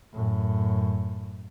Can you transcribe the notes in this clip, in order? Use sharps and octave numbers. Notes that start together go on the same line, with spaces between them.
F#2 A2